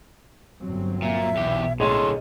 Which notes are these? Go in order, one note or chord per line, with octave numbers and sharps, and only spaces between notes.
G1 F#3 C4
A#2 E5
B1 E2 B2 G4
A2 D3 G#4 C#5 D#5 C6